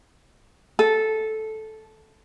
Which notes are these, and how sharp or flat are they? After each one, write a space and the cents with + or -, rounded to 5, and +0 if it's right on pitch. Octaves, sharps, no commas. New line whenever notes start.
A4 -10